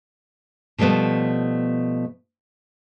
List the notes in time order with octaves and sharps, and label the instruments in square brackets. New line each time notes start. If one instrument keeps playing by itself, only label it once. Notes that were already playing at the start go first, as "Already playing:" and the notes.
[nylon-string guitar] B2 F3 G3 A3 B3